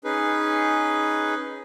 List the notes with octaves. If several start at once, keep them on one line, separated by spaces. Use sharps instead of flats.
C#4 D#4 G#4 B4